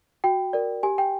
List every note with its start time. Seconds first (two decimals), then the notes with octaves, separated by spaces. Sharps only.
0.24 F#4 G5
0.53 A#4 D5
0.83 G4 G#5
0.98 G5